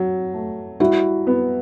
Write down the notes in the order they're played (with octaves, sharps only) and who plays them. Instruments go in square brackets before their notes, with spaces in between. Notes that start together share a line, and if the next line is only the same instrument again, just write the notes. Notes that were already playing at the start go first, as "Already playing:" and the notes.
Already playing: [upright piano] F#3
A3
[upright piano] G3 [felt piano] E4 F#4
[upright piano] B3